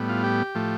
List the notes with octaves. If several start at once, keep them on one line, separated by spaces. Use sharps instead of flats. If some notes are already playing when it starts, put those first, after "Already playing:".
Already playing: A2 G3 B3
F4
G4
A2 F3 A3